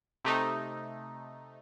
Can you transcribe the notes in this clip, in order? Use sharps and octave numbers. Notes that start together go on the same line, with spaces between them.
C3 A3 D#4